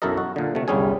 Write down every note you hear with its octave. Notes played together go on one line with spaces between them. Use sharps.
B1 F#2 E4 A4 A#4 D#5
F#4
A#2 D3
C3 A3
G1 C2 G3 C#4 G#4 G#5